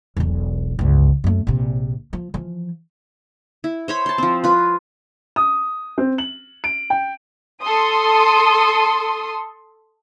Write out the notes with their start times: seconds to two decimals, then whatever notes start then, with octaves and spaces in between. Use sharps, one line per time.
0.17 E1 B1
0.79 G1 C#2
1.24 F#2 A3
1.47 A#1 C3
2.13 F3
2.34 E3 F3
3.64 E4
3.88 C5 C#5 B5
4.06 A5 C6
4.18 F3 C4
4.44 F4 B4
5.36 D#6
5.98 C4
6.18 F#7
6.64 D7
6.90 G5
7.62 A4 C6 D#6